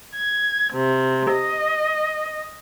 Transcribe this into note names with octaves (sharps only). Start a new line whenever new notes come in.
G#6
C3
D#5